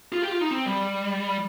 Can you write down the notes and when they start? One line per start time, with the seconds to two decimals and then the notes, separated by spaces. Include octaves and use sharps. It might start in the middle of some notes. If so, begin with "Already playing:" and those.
0.12 F4
0.22 G4
0.31 F4
0.41 D#4
0.51 C4
0.65 G3